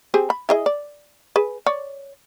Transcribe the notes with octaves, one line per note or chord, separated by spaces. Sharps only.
C4 G4 G#4
B5
E4 G#4 D#5
D5
G#4 B4
C#5 D5